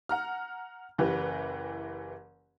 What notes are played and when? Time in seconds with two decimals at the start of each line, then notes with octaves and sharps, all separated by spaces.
0.09 F#5 A#5 F6
0.98 F#1 E3 G4 B4